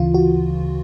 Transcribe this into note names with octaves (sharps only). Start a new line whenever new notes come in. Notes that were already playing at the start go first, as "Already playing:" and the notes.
Already playing: D2 C#3 E3 F4
F#4